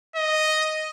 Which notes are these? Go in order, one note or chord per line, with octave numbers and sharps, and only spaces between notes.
D#5